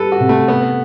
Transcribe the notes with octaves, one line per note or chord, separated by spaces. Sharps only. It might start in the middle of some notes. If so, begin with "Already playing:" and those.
Already playing: G3 G4 A4 B4
F#4
C3
A3
A3 B3